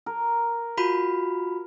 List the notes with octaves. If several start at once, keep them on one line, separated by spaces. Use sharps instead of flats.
A#4
F4 F#4 B5